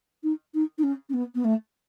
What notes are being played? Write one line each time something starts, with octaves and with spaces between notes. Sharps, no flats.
D#4
D#4
D#4
C#4
C#4
B3
B3
A3